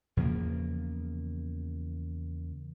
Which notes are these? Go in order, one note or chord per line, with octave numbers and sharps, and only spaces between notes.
E2 C#3 F3 A#3